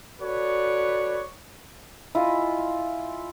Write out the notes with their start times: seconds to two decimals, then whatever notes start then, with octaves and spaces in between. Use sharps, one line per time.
0.20 F#4 A4 B4 C#5 D5
2.15 E4 F4 D#5 G#5